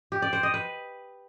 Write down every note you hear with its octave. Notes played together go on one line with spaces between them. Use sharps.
G4
D5
C5
D#5
B4